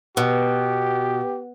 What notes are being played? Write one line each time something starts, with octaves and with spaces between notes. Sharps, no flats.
B2 G4